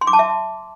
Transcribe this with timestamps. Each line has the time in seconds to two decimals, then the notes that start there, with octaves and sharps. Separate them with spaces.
0.01 C6
0.07 D6
0.13 A5
0.19 E5